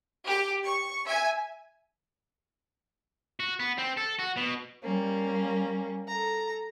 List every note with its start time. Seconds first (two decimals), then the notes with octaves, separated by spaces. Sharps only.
0.25 G4
0.64 C#6
1.06 E5 G#5
3.40 F#4
3.60 B3
3.78 C4
3.97 A4
4.19 F#4
4.37 B2
4.84 G3 A#3 C#4
6.09 A4 A#5